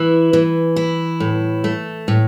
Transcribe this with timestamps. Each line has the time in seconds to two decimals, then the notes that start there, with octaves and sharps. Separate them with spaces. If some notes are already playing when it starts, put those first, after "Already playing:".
Already playing: E3 E4
0.33 E3
0.76 E4
1.20 A2
1.64 A3
2.08 A2